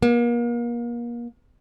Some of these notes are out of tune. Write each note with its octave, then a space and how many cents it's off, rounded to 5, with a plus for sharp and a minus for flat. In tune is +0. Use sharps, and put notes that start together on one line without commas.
A#3 +35